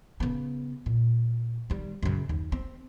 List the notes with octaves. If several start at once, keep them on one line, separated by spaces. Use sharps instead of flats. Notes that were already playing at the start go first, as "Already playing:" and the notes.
C#3 B3
A#2
D#3 G3
F#2 C#3
D#2
C4